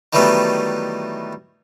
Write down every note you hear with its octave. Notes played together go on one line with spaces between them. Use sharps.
D#3 E3 F#3 G3 A3 B3